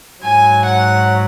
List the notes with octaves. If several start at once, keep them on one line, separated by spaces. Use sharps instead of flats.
G#2 F#3 G#5
F#5